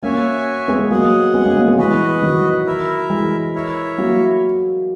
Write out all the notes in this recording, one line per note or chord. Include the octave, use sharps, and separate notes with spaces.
A#3 C#4 F#4 C#5 E5 G#5
G#3 B3
F#3 A#3 G#4 D#5 F#5
G#3 B3
A#3 C#4
A#3 C#4
G#3 B3
E3 G#3 F#4 B4 D#5
D#3 F#3
E4 A#4 E5
E3 G#3
E4 A#4 C#5 E5
F#3 A#3